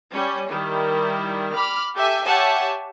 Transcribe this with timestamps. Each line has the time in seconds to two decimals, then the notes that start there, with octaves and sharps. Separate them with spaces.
0.13 G3 C#4
0.50 D#3 G3 E4
1.55 B5 D6 F6
1.96 G4 A4 E5 G#5
2.25 G4 C#5 E5 F#5 G#5 A5